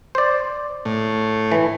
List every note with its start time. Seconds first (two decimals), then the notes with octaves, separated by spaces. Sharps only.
0.15 C5 D5
0.85 A2
1.52 E3